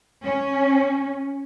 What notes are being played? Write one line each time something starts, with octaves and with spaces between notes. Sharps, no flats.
C#4